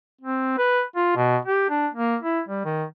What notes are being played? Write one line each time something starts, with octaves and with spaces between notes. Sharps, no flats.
C4
B4
F4
B2
G4
D4
A#3
E4
G3
D#3